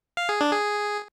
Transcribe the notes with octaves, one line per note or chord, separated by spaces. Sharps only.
F5
G#4
D4
G#4